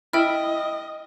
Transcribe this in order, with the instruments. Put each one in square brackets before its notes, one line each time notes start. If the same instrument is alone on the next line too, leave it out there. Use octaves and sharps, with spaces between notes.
[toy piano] E4 [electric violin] D#5 [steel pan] E5 B5 [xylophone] G5 F6